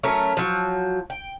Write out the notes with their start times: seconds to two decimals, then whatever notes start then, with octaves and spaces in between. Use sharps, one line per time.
0.03 F#3 A3 C#4 A#4
0.37 F3 F#3
1.10 G5